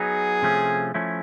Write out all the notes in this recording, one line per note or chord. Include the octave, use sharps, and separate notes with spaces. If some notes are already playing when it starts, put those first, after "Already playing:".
Already playing: F#3 B3 D#4 G#4
C3 F3 A3 C#4
F3 A3 C#4 E4